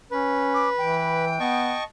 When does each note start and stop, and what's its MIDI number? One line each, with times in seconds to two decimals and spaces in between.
0.11 0.70 61
0.11 1.25 71
0.54 0.70 86
0.78 1.36 52
0.78 1.83 79
1.40 1.74 59
1.40 1.84 75
1.40 1.84 81
1.40 1.84 85